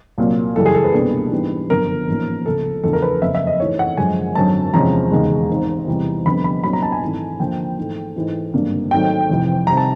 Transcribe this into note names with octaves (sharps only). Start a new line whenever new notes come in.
C2 A#2 F#3 A#3
F#2 C#3 E3 G3 A4
G#4
A4
B4
C2 B2 G3 A#3 D4
G#2 E3 G3 B3 D4
G1 F#2 D3 F3 A#4
A1 G#2 F3 A#3 C#4
C#2 C#3 F3 A4
E2 C#3 F3 A3 D4 A4
A#4
B4
F#1 F2 C#3 E5
E5
D#5
G#2 E3 A3 C#5
F#5
F#2 D3 F3 G#3 G#5
G#1 F#2 D3 F#3 A5
E2 C3 F3 G#3 C#4 A#5
E1 D#2 C#3 F3 G#3
G#1 G#2 D#3
E2 C3 E3 G3
F1 F2 D3 G3 B3 B5
B5
C2 A#2 F#3 B3 D4 B5
A#5
A5
G#5
G#1 G#2 E3 A3
F2 D3 F3 A#3 G5
G#2 E3 A3
G#2 E3 A3
G#1 G2 D3 F#3 A#3
G#1 G#2 D#3 F#3 A3 G5
F1 F2 C3 E3
C3 D#3 G3 A#5
A5